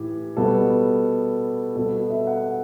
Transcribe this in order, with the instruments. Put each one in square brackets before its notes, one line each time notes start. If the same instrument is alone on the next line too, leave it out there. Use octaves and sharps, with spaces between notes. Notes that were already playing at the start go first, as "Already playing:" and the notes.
Already playing: [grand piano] A2 E3 G4
B2 G3 B3 A4
B2 G3 B3 A4
F#4
E5
F#5